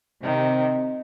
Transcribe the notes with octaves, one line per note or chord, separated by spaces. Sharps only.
C3 D#3